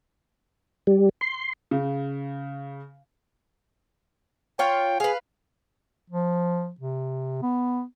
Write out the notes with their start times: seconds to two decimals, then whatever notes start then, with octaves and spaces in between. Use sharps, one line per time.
0.87 G3
1.21 C6
1.71 C#3
4.59 F4 C#5 G5
5.00 G#4 B4 F5
6.10 F3
6.80 C3
7.42 B3